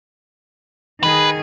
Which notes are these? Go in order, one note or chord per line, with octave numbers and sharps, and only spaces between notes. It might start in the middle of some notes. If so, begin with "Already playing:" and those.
D#3 G#4 B4